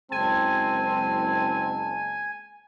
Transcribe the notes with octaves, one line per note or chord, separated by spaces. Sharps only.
F#1 G#3 C4 G#5 A5